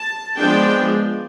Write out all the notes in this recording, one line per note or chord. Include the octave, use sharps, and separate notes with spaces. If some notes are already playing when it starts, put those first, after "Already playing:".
Already playing: A5
F3 G#3 B3 D4 G5